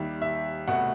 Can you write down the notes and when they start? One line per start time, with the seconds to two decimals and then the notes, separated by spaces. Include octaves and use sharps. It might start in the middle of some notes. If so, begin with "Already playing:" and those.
Already playing: D#2 D#3 G3 E5
0.22 E5
0.68 C2 B2 A3 F#5